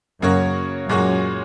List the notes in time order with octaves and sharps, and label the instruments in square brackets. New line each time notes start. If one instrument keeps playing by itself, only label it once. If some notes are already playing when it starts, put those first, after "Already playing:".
[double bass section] F#2 [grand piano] C#3 A#3 F#4 C#5
[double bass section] F#2 [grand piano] A#2 G#3 F#4 C#5